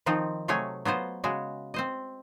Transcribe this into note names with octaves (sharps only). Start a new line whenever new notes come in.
D#3 F3 C4 D#4 F4
C3 F#3 A3 G#4 C#5 G#5
F#3 B3 F4 C5 D#5
C#3 G#3 F#4 G#4
C4 C5 D#5